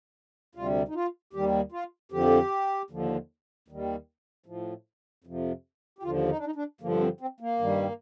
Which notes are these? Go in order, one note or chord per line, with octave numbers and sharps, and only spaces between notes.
D2 C3 G3 F4
D#4
F4
D#2 D#3 G3 G4
F4
F2 D3 F3 G4
D#2 D3 F3
D#2 D#3 G3
A2 F3
F2 C3 F3
G4
D#2 D3 F3 F4
D#4
D4
D#4
D4
G2 D3 F3 A#3
C4
C4
A#3
G2 D#3 G3